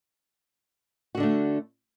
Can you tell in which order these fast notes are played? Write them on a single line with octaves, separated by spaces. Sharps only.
F#4 D3 D4 A3